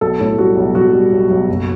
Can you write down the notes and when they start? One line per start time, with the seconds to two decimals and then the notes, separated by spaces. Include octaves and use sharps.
0.01 B1 A4
0.20 A2
0.38 G3 F#4
0.57 B1
0.75 B1 F#4
0.93 G3
1.12 B1
1.30 B1
1.48 F#1